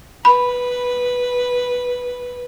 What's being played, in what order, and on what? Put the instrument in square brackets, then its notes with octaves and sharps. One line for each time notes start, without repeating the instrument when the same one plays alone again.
[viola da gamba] B4 [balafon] B5